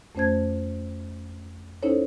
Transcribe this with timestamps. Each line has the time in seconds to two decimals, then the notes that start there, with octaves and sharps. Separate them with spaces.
0.15 F2 A3 C#4 C5 A5 G#6
1.83 C#4 D#4 E4 A4 C5 C#5